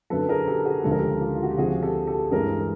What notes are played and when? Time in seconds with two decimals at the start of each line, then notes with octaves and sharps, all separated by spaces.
0.10 F#2 D3 F#3 A4 B4
0.29 G#4 A#4
0.47 G4 A4
0.65 F#4 G#4
0.84 D2 C#3 F3 G#3 A4
0.91 A#4
0.99 G4 A4
1.21 F4 G4
1.35 F4
1.43 F#4
1.51 G4
1.57 D2 C3 F3 F#4 G#4
1.83 G4 A4
2.07 G4 A4
2.31 G2 E3 G#3 G#4 A#4